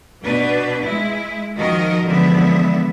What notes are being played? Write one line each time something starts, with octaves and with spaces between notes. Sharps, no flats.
B2 D4 B4
G#3 E4
D#3 F3 F#4 A#4 D#5
D3 E3 F3 G#3 B3 E5